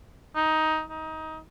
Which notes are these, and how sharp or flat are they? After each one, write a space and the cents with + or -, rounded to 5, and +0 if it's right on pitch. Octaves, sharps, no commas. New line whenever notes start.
D#4 +15
D#4 +20